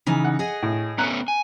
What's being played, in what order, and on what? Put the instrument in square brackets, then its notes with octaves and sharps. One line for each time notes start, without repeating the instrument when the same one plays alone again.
[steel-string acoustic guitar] C#3 E3 D#4
[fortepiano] F#5
[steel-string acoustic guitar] G#4 D#5
[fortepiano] A2
[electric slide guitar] A3 B3 C#4 [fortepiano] A#5 F#6
[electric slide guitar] G#5